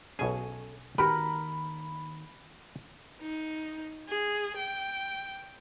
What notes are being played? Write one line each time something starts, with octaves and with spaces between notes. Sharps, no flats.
B1 B2 C#4 G#4 A4 C#5 G#5
D#2 D#3 F#4 G4 A#4 B4 B5
D#4
G#4
G5